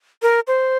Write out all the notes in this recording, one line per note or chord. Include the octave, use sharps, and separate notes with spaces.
A#4
C5